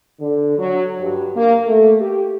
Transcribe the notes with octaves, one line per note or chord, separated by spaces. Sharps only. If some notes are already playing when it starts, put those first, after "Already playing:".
D3
F#3
G2
A#3
A3
G4